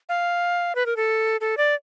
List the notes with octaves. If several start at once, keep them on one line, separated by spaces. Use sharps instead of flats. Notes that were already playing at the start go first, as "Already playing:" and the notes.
F5
B4
A#4
A4
A4
D5